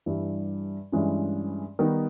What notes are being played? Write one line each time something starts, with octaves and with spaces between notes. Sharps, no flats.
G2 E3 G3
G2 E3 G#3 C#4
D#3 G3 B3 D#4